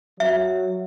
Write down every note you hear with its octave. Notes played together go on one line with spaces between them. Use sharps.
F#3 E5